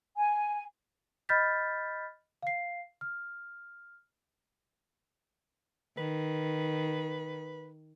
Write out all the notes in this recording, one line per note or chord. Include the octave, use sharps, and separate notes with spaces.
G#5
D#5 B5 F6 G6 A6 B6
F5 C7
F6
D#3 B4